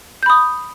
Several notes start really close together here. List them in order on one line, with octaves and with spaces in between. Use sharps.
G6 B5 D#6